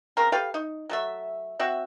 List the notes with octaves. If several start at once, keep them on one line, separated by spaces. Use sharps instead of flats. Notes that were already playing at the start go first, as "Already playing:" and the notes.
C#3 C4 A#4
G4 A4 B4 F5
D#4
F#3 A3 E5
C4 F#4 E5